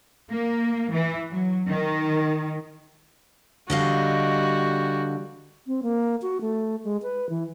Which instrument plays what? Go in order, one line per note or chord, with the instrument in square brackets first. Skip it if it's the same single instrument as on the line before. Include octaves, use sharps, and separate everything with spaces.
[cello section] A#3
E3
F#3
D#3
[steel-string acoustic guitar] D3 D#5 F5 [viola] G3 F#4
[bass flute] C4
A#3
F#4
A3
G#3
B4
E3